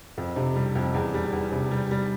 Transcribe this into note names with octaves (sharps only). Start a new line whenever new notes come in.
F2
C3
G3
F2
E2
G3
E2
C3
G3
G3